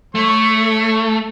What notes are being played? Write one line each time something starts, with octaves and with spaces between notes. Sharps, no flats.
A3 C#5 C#6